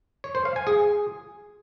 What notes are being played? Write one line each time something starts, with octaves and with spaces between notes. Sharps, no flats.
C#5
C5
F5
G#5
G#4